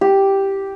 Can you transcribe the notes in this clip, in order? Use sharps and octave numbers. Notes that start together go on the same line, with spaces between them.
G4